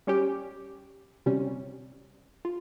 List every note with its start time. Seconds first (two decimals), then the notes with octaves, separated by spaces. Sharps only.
0.07 G3 C#4 G4
1.26 C3 G3 C#4
2.45 F4